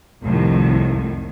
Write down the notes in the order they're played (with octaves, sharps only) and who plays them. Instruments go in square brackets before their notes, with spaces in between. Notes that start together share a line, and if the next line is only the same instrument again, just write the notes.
[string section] C2 F2 A2 D#3